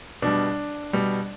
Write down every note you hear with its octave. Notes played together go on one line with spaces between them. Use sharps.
B2 G3 D4
B2 G3